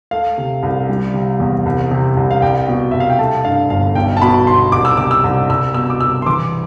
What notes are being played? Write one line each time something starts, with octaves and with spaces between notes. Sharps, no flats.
A3 F5
C3
C2
G3
C3
E2
C2
C3
C2
F5
C2 G5
B2
C2 E5
F5
G5
A3 A5
G2 F5
G1 F5
B1 G5
A5
B2 B5
B1 C6
C2 D6
E6
C3 D6
E6
C2
C2 E6
B2 E6
D6
C2 E6
C6
E3 D6